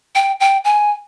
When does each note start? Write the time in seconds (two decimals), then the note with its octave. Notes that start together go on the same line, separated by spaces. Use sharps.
0.15 G5
0.40 G5
0.65 G#5